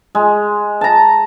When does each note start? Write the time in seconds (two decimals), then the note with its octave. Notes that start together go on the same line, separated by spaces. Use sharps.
0.15 G#3
0.81 A5 A#5